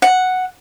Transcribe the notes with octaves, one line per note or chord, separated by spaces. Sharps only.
F#5